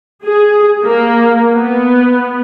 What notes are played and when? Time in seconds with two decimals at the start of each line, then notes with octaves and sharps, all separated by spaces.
0.24 G#4
0.85 A#3
1.54 B3